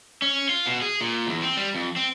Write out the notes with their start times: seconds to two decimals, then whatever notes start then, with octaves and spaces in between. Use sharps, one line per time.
0.22 C#4
0.49 F4
0.66 B2
0.82 G#4
1.01 A#2
1.27 E2
1.42 C4
1.57 G3
1.75 F2
1.96 C4